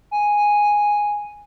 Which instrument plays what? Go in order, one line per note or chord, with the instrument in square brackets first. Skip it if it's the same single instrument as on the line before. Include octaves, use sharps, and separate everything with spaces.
[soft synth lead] G#5